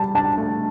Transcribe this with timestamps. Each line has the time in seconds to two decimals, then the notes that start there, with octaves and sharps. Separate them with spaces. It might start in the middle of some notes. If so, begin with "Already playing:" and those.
Already playing: G3 A5
0.15 D4 A5
0.38 A3